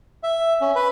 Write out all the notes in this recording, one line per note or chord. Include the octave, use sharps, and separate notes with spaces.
E5
C#4
B4